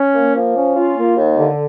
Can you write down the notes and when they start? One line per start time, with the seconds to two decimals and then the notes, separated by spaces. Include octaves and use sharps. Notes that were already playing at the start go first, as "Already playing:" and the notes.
Already playing: C#4
0.14 A#3
0.35 F3
0.55 C#4
0.76 F4
0.97 A#3
1.17 D#2
1.38 D3